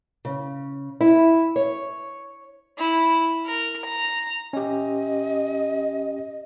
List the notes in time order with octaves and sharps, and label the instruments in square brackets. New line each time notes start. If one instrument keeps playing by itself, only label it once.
[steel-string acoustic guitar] C#3
E4
C#5
[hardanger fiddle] E4
A#4
A#5
[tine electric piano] C#4 G4 [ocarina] D#5